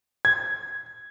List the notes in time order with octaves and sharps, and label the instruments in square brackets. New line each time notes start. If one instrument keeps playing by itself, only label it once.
[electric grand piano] G#6